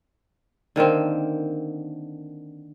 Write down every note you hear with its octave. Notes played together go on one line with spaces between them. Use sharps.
D3 D#3 A#3 C4